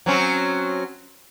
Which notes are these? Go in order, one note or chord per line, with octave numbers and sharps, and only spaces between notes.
F#3 C4 C#4